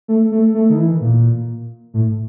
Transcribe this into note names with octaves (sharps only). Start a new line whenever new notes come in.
A3
A3
A3
D#3
E3
A#2
A2